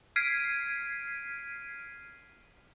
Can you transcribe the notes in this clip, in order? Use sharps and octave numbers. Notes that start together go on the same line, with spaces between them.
F6 G#6 B6 C7 D7 D#7